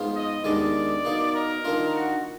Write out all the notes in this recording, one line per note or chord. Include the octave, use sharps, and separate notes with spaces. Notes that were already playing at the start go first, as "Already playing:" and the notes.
Already playing: G#2 F3 B3 F4
D#5
D#2 D#3 G#3 B3 D4 D5
B2 A#3 D#4
A#4
D#3 A#3 D4 F4
F#4